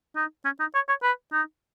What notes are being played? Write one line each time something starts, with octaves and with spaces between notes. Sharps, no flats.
D#4
C#4
D#4
C#5
C#5
B4
D#4